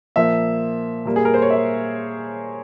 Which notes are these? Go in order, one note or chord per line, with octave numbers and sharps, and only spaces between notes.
A#2 F3 A#3 E5
A#2 G3 A#3
G#4
A#4
C5
C#5
E5